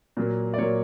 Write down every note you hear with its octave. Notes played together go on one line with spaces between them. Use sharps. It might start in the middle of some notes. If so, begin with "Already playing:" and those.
A#2 F#3 A#3
D5
A#2 F#3 A#3 C#5